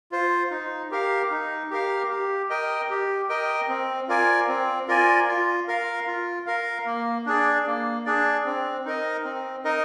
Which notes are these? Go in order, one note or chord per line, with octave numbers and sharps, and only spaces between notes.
F4 C5
D#4
G4 A#4 F5
D#4
G4 A#4 F5
G4
A#4 D#5 G5
G4
A#4 D#5 G5
C4
F4 A#4 D5 G#5
C4
F4 A#4 D5 G#5
F4
A#4 F5
F4
A#4 F5
A#3
D4 G#4 D5
A#3
D4 G#4 D5
C4
D#4 A#4 D#5
C4
D#4 A#4 D#5